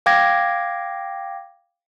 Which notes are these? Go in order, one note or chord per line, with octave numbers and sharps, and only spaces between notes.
F5 G5 D6 G#6 A#6